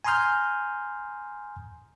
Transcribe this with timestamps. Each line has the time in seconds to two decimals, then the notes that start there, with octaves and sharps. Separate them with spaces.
0.04 G#5 A#5 C6 D#6 F6 G6